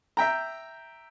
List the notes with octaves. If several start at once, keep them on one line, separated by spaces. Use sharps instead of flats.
E5 G5 A#5